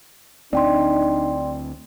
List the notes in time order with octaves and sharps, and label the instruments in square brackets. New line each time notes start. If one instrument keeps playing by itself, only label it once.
[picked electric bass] D2 C4 [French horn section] D4 D#4 [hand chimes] D5 G5 C6